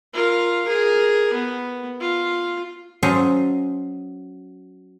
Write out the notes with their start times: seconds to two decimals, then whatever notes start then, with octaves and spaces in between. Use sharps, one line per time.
0.13 F4 A#4
0.65 G#4 A#4
1.33 B3
2.00 F4
3.03 F#3 C#4 A4 C5 D#5 F5